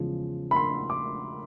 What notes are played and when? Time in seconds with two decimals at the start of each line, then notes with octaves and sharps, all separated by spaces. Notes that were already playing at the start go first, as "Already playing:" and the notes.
Already playing: E2 C#3 F3 G#3
0.51 B5
0.56 C6
0.90 D6